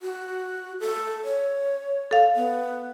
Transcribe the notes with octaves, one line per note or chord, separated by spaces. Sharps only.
F#4
A4
C#5
A4 F5
B3